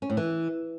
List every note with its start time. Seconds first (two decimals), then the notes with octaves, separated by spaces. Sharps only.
0.02 C#4
0.10 A2
0.17 E3